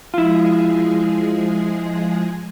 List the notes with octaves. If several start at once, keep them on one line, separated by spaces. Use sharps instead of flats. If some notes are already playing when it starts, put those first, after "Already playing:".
F3 G#3 E4 F4 G#4